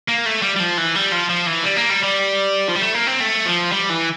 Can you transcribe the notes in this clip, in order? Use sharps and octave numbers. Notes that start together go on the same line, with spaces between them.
A#3
A3
G3
G3
F3
E3
G3
F3
F3
E3
G3
A#3
G3
G3
F3
G3
A3
A#3
C4
A3
F3
G3
E3